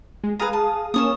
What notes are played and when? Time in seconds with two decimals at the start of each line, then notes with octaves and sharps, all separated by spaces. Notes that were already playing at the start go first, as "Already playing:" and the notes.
0.24 G#3
0.39 G#4 B4 F5 A#5 D#6
0.53 A5
0.94 A#3 C#4 F4 C#6 D#6 E7